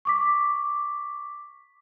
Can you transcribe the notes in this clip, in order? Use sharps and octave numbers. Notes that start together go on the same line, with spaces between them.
C#6 D6 B6